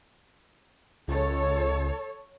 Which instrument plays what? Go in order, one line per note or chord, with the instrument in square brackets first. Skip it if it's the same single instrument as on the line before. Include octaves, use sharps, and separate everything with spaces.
[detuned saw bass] C#2 [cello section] A4 C#5